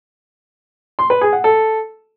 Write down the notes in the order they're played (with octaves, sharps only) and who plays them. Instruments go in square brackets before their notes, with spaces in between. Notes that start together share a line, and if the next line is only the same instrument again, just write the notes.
[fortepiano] C6
B4
G#4
F#5
A4